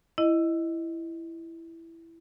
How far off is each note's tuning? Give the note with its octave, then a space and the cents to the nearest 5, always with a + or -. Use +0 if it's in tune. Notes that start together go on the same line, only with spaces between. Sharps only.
E4 +5 D#5 +0